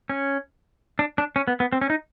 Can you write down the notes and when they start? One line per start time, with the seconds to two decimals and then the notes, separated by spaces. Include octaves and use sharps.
0.10 C#4
0.99 D4
1.18 D4
1.36 C#4
1.48 B3
1.60 B3
1.73 C4
1.81 C#4
1.90 D#4